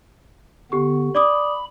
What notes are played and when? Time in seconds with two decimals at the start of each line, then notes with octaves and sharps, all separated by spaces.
0.72 D3 B3 G4 C#6
1.15 D5 B5 D6 D#6